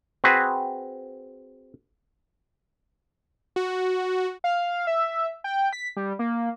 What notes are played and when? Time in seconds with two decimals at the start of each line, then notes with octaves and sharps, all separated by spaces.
0.24 C4 F#4 G#4 B4
3.56 F#4
4.44 F5
4.87 E5
5.44 G5
5.73 B6
5.97 G3
6.19 A#3